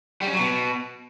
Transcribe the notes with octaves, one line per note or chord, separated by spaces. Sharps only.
G3
C#4
F#3
B2